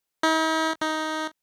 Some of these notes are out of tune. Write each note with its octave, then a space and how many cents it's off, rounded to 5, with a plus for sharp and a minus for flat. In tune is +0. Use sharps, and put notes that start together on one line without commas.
D#4 +45
D#4 +10